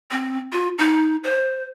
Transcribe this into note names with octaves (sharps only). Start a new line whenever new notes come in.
C4
F4
D#4
C5